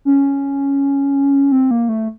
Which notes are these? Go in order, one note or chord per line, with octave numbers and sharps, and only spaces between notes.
C#4
C4
A#3
A3